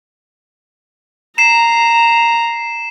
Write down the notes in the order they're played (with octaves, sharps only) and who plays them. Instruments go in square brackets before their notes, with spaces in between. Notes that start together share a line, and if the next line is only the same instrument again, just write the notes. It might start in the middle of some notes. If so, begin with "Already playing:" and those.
[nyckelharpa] A#5 [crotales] C7 E7